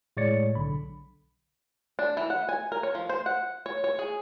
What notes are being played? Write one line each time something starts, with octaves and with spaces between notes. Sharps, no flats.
A2 G#3 C#5 D5 A6 C#7
B1 D3 B5
D4
E3
F#5
G#5
A#4
C#5
F3
C5
F#5
C#5
C#5
G#4